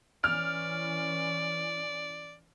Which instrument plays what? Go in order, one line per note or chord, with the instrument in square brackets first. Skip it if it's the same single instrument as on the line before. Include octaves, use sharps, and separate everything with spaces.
[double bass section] E3 C#4 [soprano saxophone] D5 [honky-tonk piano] F6